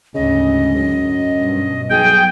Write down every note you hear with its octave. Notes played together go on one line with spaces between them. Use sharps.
D2 G#2 C#3 D#5
F#2
G2 B2
B1 F#3 G#4 G5